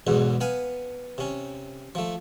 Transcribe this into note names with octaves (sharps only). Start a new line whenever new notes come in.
B1 E2 G#2 B2
B3 F5 G#5
C3 C#4
F3 A3